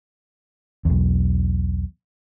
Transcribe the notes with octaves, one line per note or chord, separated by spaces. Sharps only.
B1 E2